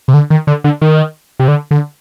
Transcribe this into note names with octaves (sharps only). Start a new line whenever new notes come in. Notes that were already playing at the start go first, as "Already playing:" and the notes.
C3
D3
D#3
D3
D3
D#3
C3
D3
D3